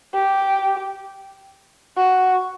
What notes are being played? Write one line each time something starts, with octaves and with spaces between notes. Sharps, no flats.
G4
F#4